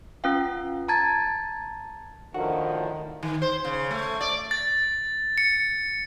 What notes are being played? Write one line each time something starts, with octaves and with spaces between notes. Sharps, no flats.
C#4 F4 B4 F5 G5
A5 A#5 G#6 A6
A2 D3 D#3 F3 F#4
D#3
C5
C#3
A3
D5
A6
C#7